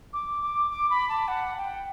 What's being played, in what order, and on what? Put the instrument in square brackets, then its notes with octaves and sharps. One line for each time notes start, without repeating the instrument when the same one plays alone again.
[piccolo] D6
D6
D6
B5
A5
F#5
G5